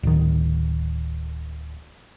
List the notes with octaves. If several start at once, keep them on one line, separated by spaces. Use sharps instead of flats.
D1 D#3